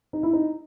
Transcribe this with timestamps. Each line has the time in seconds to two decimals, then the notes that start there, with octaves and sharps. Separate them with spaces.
0.13 D#4
0.23 E4
0.33 D#4